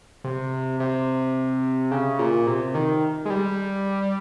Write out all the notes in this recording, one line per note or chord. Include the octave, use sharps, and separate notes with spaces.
C3
C3
C#3
A#2
C3
D#3
G#3
G3